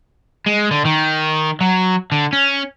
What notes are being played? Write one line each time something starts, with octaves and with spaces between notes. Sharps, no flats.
G#3
D3
D#3
F#3
D3
C#4